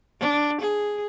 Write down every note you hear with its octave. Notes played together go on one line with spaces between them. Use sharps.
D4
G#4